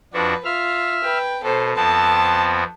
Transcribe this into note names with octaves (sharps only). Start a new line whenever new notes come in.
F2 D4 F#4 B4
F4 E5 F6
B4 G5
B2 A4 C5
F2 B3 C4 A5